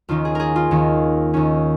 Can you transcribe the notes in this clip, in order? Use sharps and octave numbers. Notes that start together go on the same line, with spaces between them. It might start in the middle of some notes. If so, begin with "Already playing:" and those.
D#2 D#3 C#4 F4
G#4
G#4 A#4
F4
D#2 D#3 C#4
D#2 D#3 C#4